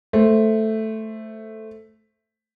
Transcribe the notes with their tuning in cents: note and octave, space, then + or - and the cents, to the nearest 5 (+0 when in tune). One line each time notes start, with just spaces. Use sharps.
A3 +0 C5 +0